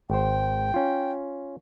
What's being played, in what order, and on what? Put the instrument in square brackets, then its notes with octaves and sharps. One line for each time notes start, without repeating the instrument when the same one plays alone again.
[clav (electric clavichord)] G#1 C5 [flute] G5
[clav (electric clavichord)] C#4 F4